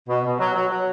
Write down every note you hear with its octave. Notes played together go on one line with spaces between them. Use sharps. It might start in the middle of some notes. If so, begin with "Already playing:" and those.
B2
B2
F#3
F#3
F#3